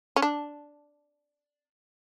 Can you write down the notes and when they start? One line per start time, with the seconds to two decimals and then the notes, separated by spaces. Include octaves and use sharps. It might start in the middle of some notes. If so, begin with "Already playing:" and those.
0.16 C#4
0.22 D4